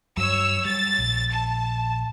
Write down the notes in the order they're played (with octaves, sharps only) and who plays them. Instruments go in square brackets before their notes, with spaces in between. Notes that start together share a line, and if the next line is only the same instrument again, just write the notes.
[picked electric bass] G2 F#3 [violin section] C#5 E6
[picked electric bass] G3 [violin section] A6
[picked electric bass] A#1
[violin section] A5